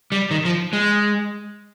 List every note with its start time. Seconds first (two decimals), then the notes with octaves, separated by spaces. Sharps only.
0.12 G3
0.31 D#3
0.45 F3
0.73 G#3